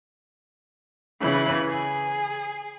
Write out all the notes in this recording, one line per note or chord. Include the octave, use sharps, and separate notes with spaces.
C#3 E3 B5
G#4